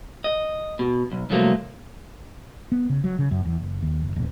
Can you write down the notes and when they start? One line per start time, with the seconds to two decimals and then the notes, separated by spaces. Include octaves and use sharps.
0.24 D#5
0.79 B2
1.11 B1
1.30 C2 F3 F#3 A3 A#3
2.72 B3
2.90 C#3
3.04 F#3
3.19 C#3
3.31 F#2
3.45 E2
3.60 F#1
3.83 D#2
4.02 F#1
4.16 D#1